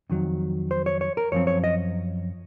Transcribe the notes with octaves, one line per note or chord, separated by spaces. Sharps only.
F2 D#3 F#3
C5
C#5
C#5
A#4
F#2 F3 C4 C#5
C#5
D#5